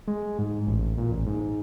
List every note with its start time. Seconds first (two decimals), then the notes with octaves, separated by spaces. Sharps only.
0.08 G#3
0.39 G#2
0.67 A1
0.98 A#2
1.12 A1
1.27 G#2
1.41 G#2